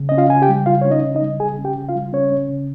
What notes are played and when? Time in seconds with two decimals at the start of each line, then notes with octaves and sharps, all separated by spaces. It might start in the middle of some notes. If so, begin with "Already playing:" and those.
Already playing: C#3
0.09 C#4 D#5
0.18 F4 F5
0.29 C#3 G#5
0.42 G4 G5
0.49 G3
0.66 C#3 F4 F5
0.81 C#4 C#5
0.90 D#4 D#5
1.04 C#3
1.15 D#4 D#5
1.21 G3
1.40 C#3 G#4 G#5
1.58 C#4
1.65 G4 G5
1.77 C#3
1.89 F4 F5
1.95 G3
2.13 C#3 C#4 C#5
2.32 C#4
2.49 C#3